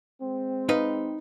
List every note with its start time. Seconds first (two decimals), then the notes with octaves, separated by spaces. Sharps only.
0.21 G#3 C4
0.69 D#4 B4 F5